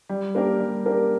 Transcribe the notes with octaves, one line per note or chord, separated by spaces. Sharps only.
G3
A#3 D4 G4 A#4
G3
A#3 D4 G4 A#4